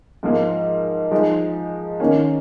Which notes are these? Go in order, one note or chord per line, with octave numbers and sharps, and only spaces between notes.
G#2 F3 A#3
F3 G#3 D#4
D#3 A#3 C#4